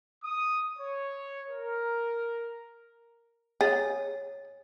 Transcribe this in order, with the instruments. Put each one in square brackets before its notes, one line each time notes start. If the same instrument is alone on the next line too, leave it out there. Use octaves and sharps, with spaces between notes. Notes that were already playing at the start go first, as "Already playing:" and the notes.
[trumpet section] D#6
C#5
A#4
[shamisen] G#4 [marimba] C#5 A6